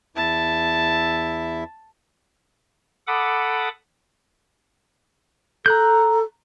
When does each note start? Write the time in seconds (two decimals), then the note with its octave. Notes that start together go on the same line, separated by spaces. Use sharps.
0.16 E2 E4 E5 A5
3.07 A4 F#5 B5 D6 D#6
5.66 A4 A#5 F#6 G6